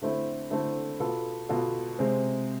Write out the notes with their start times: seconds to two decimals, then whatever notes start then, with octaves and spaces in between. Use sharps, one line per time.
0.02 D3 A3 C4 E4 A4
0.50 D3 A3 C4 E4 A4
1.00 B2 B3 F4 A4
1.49 B2 B3 F4 A4
1.99 C3 G#3 C4